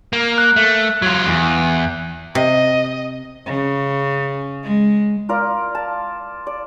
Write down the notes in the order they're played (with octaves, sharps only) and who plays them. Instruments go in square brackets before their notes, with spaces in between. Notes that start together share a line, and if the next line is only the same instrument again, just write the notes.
[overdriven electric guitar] A#3
[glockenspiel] F#6
[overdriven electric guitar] A3
F#3 F4
E2
[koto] C3 [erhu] D#5
[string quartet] C#3
G#3
[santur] F4 A#4 D5 F5
A5
D5